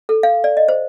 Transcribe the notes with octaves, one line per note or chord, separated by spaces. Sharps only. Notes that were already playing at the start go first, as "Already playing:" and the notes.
A4
F5
D5
D#5
C5